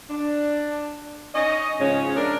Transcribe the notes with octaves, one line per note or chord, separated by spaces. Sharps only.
D4
C#4 D#4 D#5
G#2 C#3 F3 C#4
D4 A#4